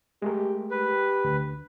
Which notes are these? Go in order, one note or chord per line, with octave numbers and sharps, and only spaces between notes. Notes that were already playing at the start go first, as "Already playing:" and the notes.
G#3 A3 G4 A#4
G4 B4
D2